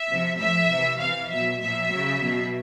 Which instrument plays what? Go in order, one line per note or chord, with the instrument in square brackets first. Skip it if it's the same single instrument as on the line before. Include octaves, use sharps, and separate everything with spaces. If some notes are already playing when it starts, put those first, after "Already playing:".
Already playing: [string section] E5
C3 F3
A2 F3 E5
C3 E3
C3 E3 F5
B2 F#3 E5
A#2 F3 E5
C#3 F#3
B2 F#3